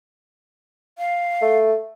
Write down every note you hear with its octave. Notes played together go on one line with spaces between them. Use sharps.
F5
A3